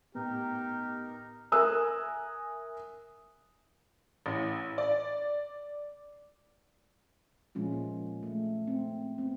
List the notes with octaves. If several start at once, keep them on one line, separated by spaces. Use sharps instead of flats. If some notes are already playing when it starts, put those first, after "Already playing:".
A2 B3 D#4 G4 A#4
A#4 E5 G#5 D#6 E6 F#6
A1
D5
A#2 F3 G#3 C#4 F4
A#3
A3
C4
B3 C4